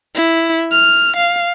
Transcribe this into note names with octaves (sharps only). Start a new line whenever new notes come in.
E4
F6
F5